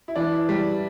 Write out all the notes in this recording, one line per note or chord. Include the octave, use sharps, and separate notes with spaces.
E4
E3 D4
E4
G3